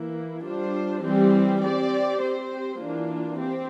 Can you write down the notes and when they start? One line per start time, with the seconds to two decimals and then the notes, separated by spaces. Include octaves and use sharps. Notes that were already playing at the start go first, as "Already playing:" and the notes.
Already playing: E3 A#3 E4
0.44 G3 D4 F4 C5
1.03 E3 G3 C4 G4
1.62 C4 G4 D5
2.20 C4 G4 C5
2.78 E3 A#3 D4 F4
3.37 C4 G4